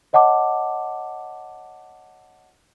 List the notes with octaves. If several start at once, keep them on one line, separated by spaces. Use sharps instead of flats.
C#5 D#5 F#5 A5 D6